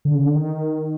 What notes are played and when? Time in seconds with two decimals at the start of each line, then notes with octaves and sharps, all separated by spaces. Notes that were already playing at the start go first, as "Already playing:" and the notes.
0.05 D3
0.15 C#3
0.26 D3
0.35 D#3